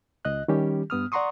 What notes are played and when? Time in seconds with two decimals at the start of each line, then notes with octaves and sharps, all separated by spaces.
0.25 C#2 D#5 F#6
0.48 D#3 G3 C#4 G4
0.90 G2 B3 D#6 F6
1.12 D5 F#5 A#5 C6 C#6 D#6